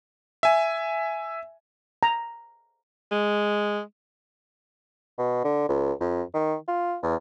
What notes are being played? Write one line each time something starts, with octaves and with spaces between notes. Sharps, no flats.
E5 G#5
A#5
G#3
B2
D3
C#2
F2
D#3
F4
E2